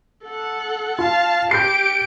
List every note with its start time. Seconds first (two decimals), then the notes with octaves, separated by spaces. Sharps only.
0.25 A4 F#5
0.99 F4 F5 A5
1.51 G4 G6 C7 D7